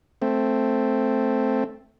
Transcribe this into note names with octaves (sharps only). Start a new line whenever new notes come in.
A3 C4